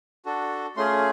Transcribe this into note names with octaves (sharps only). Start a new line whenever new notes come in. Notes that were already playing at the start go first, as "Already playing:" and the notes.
D4 F#4 A4
A3 C#4 F4 G#4 C6